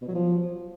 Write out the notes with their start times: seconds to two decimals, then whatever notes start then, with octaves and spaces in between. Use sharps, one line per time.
0.01 B2
0.08 F#3
0.14 F3